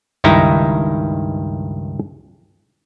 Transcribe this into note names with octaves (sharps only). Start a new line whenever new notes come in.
C#2 G2 D#3 D#4 E4 A#5